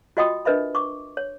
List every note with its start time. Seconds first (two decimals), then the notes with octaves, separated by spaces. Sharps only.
0.17 F4 F#4 D#5 G5 B5 D#6
0.45 D4 A#4 B4 D#5 E5 B5
0.75 C#6 D6
1.17 C#5